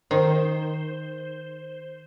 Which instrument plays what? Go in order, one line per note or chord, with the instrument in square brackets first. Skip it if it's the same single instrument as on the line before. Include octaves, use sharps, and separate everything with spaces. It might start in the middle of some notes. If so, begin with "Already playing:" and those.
[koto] D#3 [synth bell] C5